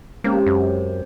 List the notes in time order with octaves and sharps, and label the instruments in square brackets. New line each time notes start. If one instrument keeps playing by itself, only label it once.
[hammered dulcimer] C3 [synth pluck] G#3 C#4 G5 [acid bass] A#3
[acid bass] F#2